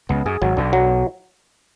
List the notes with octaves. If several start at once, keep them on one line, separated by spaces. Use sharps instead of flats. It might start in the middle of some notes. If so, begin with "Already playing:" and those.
C#2 C#3 B3
F#2 G#4
G#1 G#2 F#3
B1 B2 D4
F#3